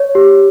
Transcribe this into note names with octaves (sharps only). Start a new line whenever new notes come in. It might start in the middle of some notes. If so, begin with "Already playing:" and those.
Already playing: C#5
G4